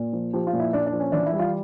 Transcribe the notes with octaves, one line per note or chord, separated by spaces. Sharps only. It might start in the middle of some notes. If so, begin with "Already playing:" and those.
Already playing: A#2
F3
F3 G4
F4
A#2
E4
A#2 D4
D4
F3
C#4
E3 D4
E4
G3
F4